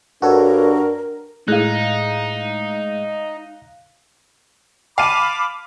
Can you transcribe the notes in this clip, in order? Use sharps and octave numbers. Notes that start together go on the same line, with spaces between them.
G2 D4 F#4 A4 A#4 C#5
A2 G#3 D#4 F5 F#6
F5 A5 B5 D6 D#7